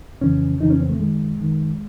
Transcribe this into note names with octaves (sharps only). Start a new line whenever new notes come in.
F2 C#3 E3 C#4
F2 C#3 E3 D#4
C#4
C4
A3
F#2 D#3 G#3
F#2 D#3